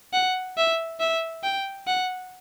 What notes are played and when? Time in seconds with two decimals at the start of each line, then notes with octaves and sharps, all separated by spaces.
0.13 F#5
0.57 E5
1.00 E5
1.43 G5
1.87 F#5